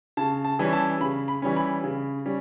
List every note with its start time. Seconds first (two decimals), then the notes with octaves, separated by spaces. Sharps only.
0.17 C#3 A5
0.45 A5
0.59 E3 G3 C#4
0.73 A5
1.00 C#3 B5
1.28 B5
1.42 E3 G3 C#4
1.56 B5
1.84 C#3
2.26 G3 C#4